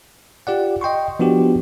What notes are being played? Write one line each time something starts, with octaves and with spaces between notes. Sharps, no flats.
F4 G4 D5 F#5
D#5 G5 C6 C#6
F3 B3 D4 F#4 G4